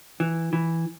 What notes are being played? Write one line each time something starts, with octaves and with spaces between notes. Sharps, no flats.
E3
E3